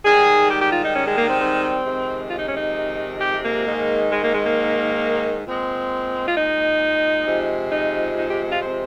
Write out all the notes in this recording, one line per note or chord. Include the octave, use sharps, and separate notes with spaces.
G#2 D#3 G3 G#4
G4
G4
F4
D#4
C#4
G#3
A#3
C4
C4
F2 C3 D#3 G#3
F4
D#4
C#4
D#4
G4
A#3
G#2 D#3 G#3
G#3
A#3
G#3
A#3
A#2 G#3 C4
F4
D#4
F2 C3 F3 G#3
D#4
D#4
G4
F4
C5